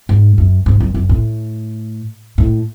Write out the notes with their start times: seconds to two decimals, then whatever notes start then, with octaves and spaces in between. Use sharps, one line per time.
0.09 G#2
0.38 F#2
0.66 G#2
0.80 F#2
0.94 F#2
1.09 A2
2.38 A2